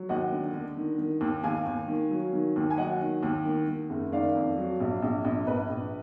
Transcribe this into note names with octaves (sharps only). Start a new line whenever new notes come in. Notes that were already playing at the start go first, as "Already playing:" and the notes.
Already playing: F#3
D#2 D#5 F#5
D3
D3
D#3
D#3
D#2
D#2 F5 G#5
D#2
D#3
F#3
D#3
D#2
G#5
F#3 D#5 F#5
D#3
D#2
D#3
D#3
F#1
D#3 D5 F5
F2
F#3
A#1
A#1
A#1
A#1 B4 D#5
A#1